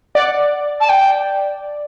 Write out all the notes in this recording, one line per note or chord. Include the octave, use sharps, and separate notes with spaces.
D5 F#5
A5
G5